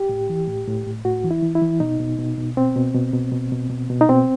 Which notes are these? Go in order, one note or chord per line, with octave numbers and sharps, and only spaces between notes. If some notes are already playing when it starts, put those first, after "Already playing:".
Already playing: G4
A2
E3
A2
A2
A2
A2 F#4
E3
E4
E3
E4
E3
B2 D#4
B2
B2
B2
B2 C4
B2
B2
B2
B2
B2
B2
B2
D#4
B2 C4